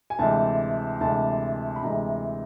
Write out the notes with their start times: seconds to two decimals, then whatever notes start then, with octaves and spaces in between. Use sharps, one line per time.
0.10 G#5
0.19 D2 C3 E3 G#3 A5
1.01 D2 C3 E3 G#3 A5
1.76 B5
1.83 D2 C3 E3 G#3 A#5